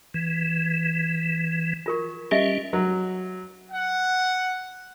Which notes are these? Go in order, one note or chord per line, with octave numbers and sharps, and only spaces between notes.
E3
F4 A#4 C#6
G3 C#4 G4 D#5 E5
F#3
F#5